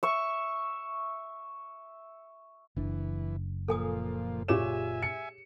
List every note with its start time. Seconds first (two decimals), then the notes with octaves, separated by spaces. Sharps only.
0.03 E5 C#6
2.77 F#1 E3 D4
3.68 A#2 F3 A#3 A4 G#5 D#6
4.48 A#2 G4 G#4 C#5 E5 G#5 E7
5.03 C#7